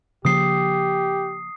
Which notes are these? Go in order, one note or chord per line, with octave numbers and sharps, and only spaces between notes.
C#3 F3 A#3 G4 D#6 C7